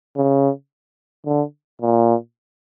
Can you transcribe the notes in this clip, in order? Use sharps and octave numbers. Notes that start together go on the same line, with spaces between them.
C#3
D3
A#2